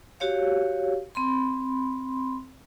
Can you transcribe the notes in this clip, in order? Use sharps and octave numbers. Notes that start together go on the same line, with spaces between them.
F#4 G4 C#5 F5
C4 B5 C6